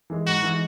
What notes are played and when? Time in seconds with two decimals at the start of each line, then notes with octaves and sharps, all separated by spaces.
0.10 E3 G#3
0.26 G#2 F#4
0.43 E3 G#3